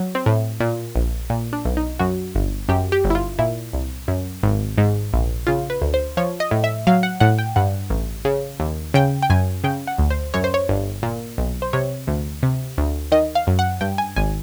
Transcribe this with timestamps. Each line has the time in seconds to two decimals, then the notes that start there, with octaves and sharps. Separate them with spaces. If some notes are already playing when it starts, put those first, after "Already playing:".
Already playing: F#3
0.15 C4
0.26 A2
0.60 A#2
0.96 A#1
1.30 A#2
1.53 D4
1.65 B1
1.77 D#4
1.99 F#2 F#4
2.35 G1
2.69 F#2 G4
2.92 G4
3.04 G1
3.10 E4
3.15 F4
3.39 A#2 E4
3.73 C2
4.08 F#2
4.43 G#1
4.78 G#2
5.13 A#1
5.47 C#3 F4
5.70 B4
5.82 D2
5.94 C5
6.17 F3 C#5
6.40 D#5
6.51 A2
6.64 E5
6.87 F#3 F5
7.03 F#5
7.20 A2 F#5
7.39 G5
7.56 G2 F#5
7.90 A1
8.25 C#3
8.60 D#2
8.94 C#3 G5
9.22 G5
9.30 F#2 G#5
9.64 C#3 G5
9.87 F#5
9.98 D2
10.10 C5
10.34 F#2 C#5
10.44 C5
10.54 C#5
10.69 G1
11.03 A#2
11.38 B1
11.62 C5
11.73 C3 C#5
12.07 D2
12.43 C3
12.78 D2
13.12 D#3 D#5
13.35 F5
13.47 F#2
13.59 F#5
13.81 G2 G5
13.98 G#5
14.16 G#1 G#5